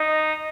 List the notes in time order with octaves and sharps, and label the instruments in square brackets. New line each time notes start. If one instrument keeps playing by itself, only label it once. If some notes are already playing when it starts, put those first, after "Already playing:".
Already playing: [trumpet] D#4